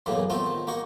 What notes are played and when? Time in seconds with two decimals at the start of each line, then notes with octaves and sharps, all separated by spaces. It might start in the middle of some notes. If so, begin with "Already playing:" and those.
0.06 B1 F#2 A2 C#3 E3 A#3
0.30 A3 B3 C4 D#4 F4
0.46 D#3
0.67 A#3 D#4 F#4 C#6